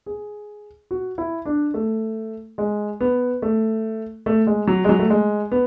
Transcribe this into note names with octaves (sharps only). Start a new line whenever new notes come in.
G#4
F#4
E4
D4
A3
G#3
B3
A3
A3
G#3
F#3
G#3
F#3
A3
G#3
B3